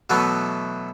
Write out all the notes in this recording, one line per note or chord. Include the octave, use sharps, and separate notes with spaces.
B2 E3 F#3 A3 B3